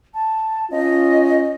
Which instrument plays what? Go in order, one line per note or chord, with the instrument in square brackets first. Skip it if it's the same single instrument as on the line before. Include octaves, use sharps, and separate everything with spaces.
[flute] A5
[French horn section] C#4 F4 [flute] D#5